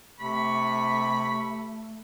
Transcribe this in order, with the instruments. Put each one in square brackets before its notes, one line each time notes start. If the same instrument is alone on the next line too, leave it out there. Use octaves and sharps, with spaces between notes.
[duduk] C3 [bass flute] A3 [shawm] B5 [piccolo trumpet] C#6